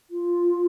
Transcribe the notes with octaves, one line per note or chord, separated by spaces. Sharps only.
F4